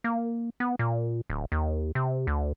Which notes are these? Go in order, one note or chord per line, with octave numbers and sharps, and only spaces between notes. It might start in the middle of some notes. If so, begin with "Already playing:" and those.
A#3
B3
A#2
D1
D#2
C3
D2